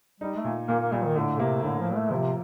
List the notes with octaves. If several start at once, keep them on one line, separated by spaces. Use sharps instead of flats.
G3 D#4
A3
A#2
A#2 A#3
A#3
A#2 G3
D#3
A2 D3
C3 A#3
A2 D3
F3
A#3
A3
C3 F3